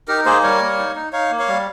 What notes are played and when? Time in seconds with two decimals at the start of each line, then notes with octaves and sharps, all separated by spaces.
0.08 D#4 G4 A#4
0.25 A#3 G#4 C5
0.43 G3 A#4 C#5
0.61 A#3
0.79 D#4
0.95 D#4
1.13 D#4 C#5 F5
1.31 A#3
1.39 C#5 F5
1.48 G3